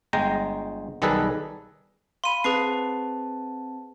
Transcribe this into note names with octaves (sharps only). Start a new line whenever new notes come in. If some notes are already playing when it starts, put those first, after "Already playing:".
G1 G#3 G5 A#5
B1 D#3 G3 G#4 A4 B4
F5 B5 C6 D#7
C4 G#4 B4 A5 C7